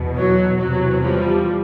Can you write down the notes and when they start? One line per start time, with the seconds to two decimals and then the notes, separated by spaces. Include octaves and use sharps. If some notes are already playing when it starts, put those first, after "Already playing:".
Already playing: E2 B2
0.17 F#3
0.59 E2 C3 E3 F#3
1.03 F3 G3